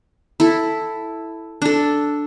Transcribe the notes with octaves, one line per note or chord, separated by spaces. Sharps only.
E4 A4
D4 A4